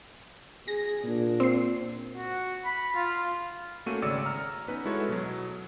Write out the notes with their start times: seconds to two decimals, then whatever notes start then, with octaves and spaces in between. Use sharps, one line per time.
0.68 G#4 A#6
1.04 A#2 D4
1.40 C4 C7
2.17 F#4
2.65 B5
2.95 F4
3.86 A3 A#3 C#4 F#4 D#7
4.02 G#1 C#3 C#5 D5 E6 C#7
4.26 A#5 F6
4.68 B3 C#4 D#4 B4
4.85 G#3 E4 F#4 A4 C#5
5.09 B2 F#3